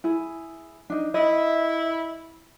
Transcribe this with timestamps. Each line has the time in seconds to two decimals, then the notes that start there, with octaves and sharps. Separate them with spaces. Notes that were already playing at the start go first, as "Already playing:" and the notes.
0.04 E4 G#4
0.90 D4 D#4
1.14 E4 D#5 E5